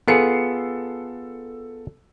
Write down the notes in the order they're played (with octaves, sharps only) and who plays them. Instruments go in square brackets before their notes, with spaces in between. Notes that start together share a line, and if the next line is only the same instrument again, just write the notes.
[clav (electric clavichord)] B3 F4 G#4 [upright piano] A4 C7 C#7